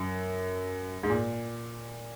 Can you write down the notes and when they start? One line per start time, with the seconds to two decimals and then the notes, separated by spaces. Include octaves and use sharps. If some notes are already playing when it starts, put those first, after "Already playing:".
Already playing: F#2
1.03 G#2
1.10 A#2